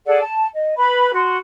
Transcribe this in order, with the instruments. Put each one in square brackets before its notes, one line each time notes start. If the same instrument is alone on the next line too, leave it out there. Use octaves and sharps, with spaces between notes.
[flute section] G#4 A4 D5 F#5
A5
D#5
B4 B5
F#4 C6